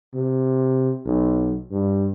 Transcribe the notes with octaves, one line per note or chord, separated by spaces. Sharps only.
C3
B1
G2